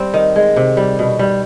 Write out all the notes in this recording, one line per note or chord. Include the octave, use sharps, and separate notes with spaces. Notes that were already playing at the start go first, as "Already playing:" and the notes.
Already playing: G3 C4
D#3
G#3
C3
G3
B2
G3